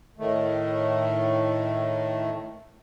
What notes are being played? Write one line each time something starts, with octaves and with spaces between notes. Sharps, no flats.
A2 D#3 A3